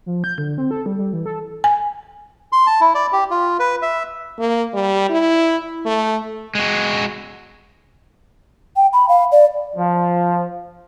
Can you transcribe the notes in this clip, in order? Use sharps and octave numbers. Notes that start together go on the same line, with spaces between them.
F3
G6
D3
C4
A4
G3
G3
E3
A4
G#5
C6
A5
E4
D5
G4
F4
B4
E5
A#3
G3
E4
A3
G#3 F#4
G5
B5
F5
D5
F3